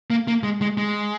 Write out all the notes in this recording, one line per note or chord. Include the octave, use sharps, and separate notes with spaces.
A#3
A#3
G#3
G#3
G#3